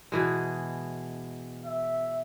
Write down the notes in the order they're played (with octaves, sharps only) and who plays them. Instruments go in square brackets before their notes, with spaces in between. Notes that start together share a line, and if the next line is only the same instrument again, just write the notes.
[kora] B2 E3 G#3
[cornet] E5